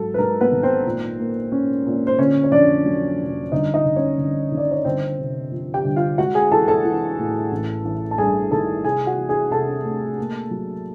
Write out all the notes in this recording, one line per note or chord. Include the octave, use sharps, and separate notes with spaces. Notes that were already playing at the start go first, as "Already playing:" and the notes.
Already playing: G#2 F#3 A4
B4
G#2 A#4
B3 B4
G#1
C4 C5
A#2
A#3
C#4
A#2
C5
D3 C#4 C#5
C#5
F2 D4 D5
F#3
F1
G1 D#4 D#5
D#4 D#5
G1
C#4 C#5
G1
D#3
D5
C#5
G1 C4 C5
C3
F3
G4 G5
G1
F4 F5
G#3 F#4 F#5
G#4 G#5
E3 A4 A5
A4 A5
E3
A2
A1
A1
A5
G2 G#4 G#5
D#3 A4 A5
C3 G#4 G#5
F#4 F#5
E3
G#4 G#5
C3 A4 A5
A3
A#3
F#3